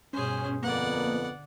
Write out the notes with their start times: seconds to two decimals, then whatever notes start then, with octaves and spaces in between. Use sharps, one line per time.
0.13 G2 B2 C#4 G#4 C5
0.63 F2 D3 A#3 B3 D5 F#5